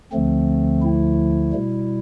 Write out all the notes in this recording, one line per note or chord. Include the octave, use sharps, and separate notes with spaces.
D2 D3 F3 A3 C4
E4
B2 G3